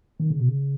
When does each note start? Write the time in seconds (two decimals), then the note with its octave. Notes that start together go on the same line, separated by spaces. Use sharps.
0.20 D#3
0.30 C#3
0.40 B2
0.48 C#3